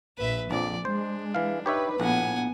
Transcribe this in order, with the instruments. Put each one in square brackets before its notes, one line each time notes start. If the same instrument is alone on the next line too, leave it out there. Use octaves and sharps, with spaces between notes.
[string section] A#1 [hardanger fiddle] B4 E5
[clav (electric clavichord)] A#1 F2 [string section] F3 [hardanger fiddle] D5
[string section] G#3 [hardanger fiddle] D4 [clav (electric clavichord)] C5
[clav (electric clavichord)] E3 F5
[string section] D#4 B4 [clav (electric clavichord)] G4 C#5 E5
[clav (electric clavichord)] A#1 A2 [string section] B3 [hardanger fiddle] F#5 G#5